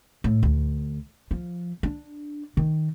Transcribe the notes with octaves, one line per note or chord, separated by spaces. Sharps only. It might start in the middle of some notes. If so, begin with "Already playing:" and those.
A2
D2
F3
D4
D#3